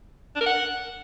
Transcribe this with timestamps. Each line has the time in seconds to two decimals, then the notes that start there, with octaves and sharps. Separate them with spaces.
0.36 D4
0.41 A#4
0.46 F#5